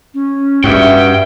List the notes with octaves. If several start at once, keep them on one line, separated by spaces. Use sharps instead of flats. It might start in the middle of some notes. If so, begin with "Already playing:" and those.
C#4
G2 F#4 E5 G5